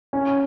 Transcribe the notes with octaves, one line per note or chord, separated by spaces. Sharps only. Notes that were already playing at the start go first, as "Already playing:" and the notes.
C#4